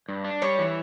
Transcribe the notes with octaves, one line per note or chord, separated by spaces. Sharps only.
G2
D4
G3 C#5
E3